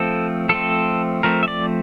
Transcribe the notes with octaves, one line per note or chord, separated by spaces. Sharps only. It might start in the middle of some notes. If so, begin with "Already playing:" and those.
Already playing: F3 A3 C4 A4
F3 A3 C4 A4
F3 A3 C4 A#4
E5
D5